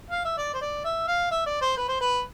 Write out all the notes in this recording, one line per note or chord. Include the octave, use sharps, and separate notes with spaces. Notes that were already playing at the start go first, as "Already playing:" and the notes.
F5
E5
D5
C5
D5
E5
F5
E5
D5
C5
B4
C5
B4